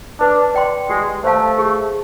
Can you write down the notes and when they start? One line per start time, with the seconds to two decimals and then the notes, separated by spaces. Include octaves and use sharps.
0.20 D4 B4
0.55 D5 G5 C6
0.90 G#3 G4
1.24 A3 C5 F5 A5
1.58 G#4